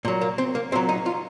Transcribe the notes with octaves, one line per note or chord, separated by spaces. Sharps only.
A#2 F#3
A#3
C4
A#3
A#2 F#3 C4
D#4
F4